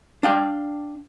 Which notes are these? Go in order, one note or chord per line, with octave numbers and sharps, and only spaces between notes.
D4 F5 G5